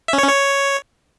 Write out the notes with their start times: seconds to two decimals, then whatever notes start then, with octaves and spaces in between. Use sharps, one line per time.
0.08 E5
0.13 C#4
0.18 C#5
0.23 C#4
0.28 C#5